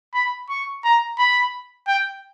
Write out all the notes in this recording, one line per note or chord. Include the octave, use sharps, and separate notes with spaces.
B5
C#6
A#5
B5
G5